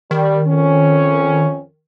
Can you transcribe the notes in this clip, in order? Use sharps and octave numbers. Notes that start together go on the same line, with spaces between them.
D#3 G3
F2 C#4